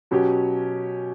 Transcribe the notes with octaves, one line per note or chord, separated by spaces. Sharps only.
B2 F#3 C#4 G4